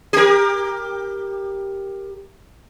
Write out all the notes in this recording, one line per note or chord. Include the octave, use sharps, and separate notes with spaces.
G4 A#4